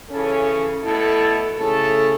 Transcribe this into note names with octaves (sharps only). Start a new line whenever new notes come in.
C#3 E3 C#4 A4
B2 A3 E4 A4
C#3 A3 E4 A4